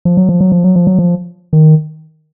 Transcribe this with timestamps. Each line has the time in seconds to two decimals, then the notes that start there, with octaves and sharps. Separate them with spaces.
0.05 F3
0.17 F#3
0.29 F3
0.41 F#3
0.52 F3
0.64 F#3
0.76 F3
0.87 F#3
0.99 F3
1.53 D#3